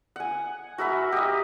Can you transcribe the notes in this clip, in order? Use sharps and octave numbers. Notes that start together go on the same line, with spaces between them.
F#5 G#5
F#4 A#4 E5 B5
G4 D#5